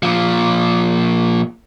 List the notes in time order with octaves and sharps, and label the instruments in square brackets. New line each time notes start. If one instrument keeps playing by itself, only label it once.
[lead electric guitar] A#2 F3